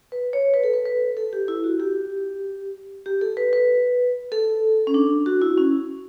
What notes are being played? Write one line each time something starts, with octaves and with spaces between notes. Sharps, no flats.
B4
C#5
B4
A4
B4
B4
A4
G4
E4
F#4
G4
G4
A4
B4
B4
A4
C#4
D4
F#4
E4
C#4